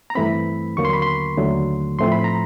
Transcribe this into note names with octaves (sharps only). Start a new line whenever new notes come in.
A#5
G2 E3 A3 C4 B5
D#2 D3 F#3 A#3 C#6
C6
B5
C6
D#2 D3 F#3 A3
A2 F3 A3 C4 C6
B5
A#5